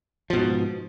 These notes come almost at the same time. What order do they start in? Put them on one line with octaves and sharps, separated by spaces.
F3 B2 G#2